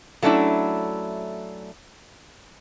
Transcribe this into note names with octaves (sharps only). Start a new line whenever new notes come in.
F#3 A3 C#4 D4 E4